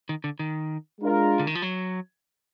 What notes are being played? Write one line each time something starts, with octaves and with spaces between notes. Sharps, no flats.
D#3
D3
D#3
G#3 D4 F4 A#4
D3
D#3
F3
F#3